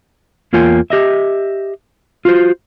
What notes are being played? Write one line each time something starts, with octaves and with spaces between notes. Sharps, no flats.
E2 A#3 F4 C#5 G5 G#5
G4 D#5 E5
F4 F#4 A#4 C5